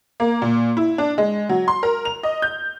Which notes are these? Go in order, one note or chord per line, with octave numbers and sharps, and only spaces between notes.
A#3
A#2
E4
D4
G#3
F#3
C6
A#4
F7
D#5
G6